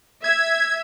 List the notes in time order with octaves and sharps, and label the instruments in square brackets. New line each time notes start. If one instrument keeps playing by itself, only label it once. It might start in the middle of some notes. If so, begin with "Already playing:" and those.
[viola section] E5 [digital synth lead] G#6